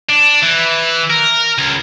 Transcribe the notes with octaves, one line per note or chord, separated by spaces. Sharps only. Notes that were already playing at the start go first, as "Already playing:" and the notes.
D4
E3
A#4
C#2